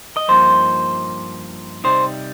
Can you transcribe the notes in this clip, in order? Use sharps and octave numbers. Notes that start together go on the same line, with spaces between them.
D#5
G2 F3 A#3 D#4 C5
C3 G3 D#4 C5